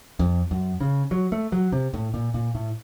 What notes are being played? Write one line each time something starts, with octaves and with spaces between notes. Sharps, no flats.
F2
F#2
C#3
F#3
A3
F#3
C3
A2
A#2
A#2
A2